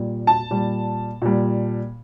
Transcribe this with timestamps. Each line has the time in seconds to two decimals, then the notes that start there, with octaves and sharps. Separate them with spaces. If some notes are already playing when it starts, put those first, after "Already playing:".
Already playing: A#2 G3
0.27 A5
0.51 A#2 G3
1.22 A#2 G3